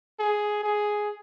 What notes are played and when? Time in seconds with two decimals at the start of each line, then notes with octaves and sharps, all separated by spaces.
0.19 G#4
0.63 G#4